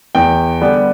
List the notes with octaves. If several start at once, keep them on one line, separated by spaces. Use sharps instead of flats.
E2 G5
D3 G3 B3